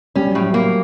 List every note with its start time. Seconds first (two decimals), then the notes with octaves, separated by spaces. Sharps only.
0.15 G3 C#4
0.27 F#3
0.35 A2 F3
0.50 F#3 A#3